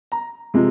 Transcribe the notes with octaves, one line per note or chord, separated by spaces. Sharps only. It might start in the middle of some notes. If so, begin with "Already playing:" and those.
A#5
C3 F3 G#3